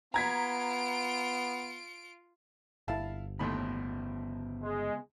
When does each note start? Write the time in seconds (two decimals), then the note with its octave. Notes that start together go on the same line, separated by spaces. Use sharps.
0.14 B3 F4 A#5 G#6 B6 D7
2.88 G1 E4 F5 A5
3.39 D#2 A2 C#3 B3 B5 C6
4.63 G#3